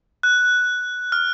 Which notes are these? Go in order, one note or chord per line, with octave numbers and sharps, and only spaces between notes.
F#6
F6